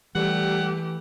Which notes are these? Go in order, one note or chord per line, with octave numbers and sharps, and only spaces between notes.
E3 G3 A3 G4 F#5